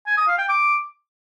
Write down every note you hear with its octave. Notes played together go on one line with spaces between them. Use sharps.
G#5
D#6
F5
G5
D6